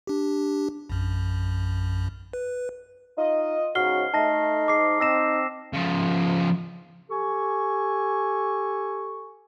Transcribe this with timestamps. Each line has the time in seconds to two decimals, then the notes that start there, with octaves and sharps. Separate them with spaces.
0.07 D4 G4
0.89 A#1 F#2
2.33 B4
3.17 D#4 F4 D#5
3.75 G#2 C#3 F#4 F6 C7 G7
4.14 A3 D#4 A5 A#6
4.68 G#2 D6 C7
5.00 C4 D#4 E6 A#6 E7
5.73 C#3 F3
7.10 G4 A4 G#5 C#6